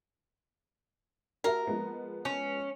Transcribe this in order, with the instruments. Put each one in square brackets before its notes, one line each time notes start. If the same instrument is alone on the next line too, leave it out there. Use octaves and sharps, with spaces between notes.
[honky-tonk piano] F#4 G4 E5 [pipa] A#4
[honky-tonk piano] F3 G#3 B3
[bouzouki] C#4